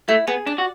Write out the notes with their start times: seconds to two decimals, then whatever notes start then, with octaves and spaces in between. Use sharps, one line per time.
0.08 A3 E4
0.27 B3 G#4
0.46 D4 D5
0.58 F#4